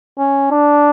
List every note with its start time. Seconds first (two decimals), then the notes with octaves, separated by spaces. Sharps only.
0.19 C#4
0.51 D4